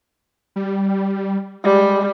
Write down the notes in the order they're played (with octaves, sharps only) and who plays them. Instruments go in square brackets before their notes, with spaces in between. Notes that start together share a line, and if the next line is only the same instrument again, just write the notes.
[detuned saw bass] G3
[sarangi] G3 [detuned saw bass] G#3